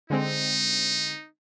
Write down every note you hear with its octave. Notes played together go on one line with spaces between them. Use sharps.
D3 G#3 C4 D#4